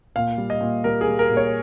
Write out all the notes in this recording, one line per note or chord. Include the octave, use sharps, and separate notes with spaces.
A#2 F5
G3
D#5
A#2
G3 A#4
G#4
G3
A#4
A#2
C#5